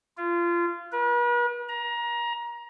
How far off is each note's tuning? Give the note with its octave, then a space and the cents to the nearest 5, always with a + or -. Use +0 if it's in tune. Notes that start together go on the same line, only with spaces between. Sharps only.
F4 -25
B4 -45
A#5 +25